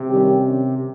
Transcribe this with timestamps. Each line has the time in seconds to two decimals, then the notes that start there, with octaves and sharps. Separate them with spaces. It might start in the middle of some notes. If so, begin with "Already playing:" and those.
Already playing: C3
0.09 D#3 G3 C#4 G4